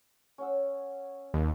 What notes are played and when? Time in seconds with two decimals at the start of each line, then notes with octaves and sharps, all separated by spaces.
0.38 C#4 F#5 E6
1.34 D#2